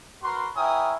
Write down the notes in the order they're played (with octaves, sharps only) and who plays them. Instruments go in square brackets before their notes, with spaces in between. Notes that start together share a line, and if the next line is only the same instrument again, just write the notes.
[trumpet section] F#4 A#4 B4 C6
E4 A#4 C#5 G5 G#5 D#6